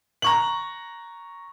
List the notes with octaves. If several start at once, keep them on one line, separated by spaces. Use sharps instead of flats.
A#5 C#6 F#7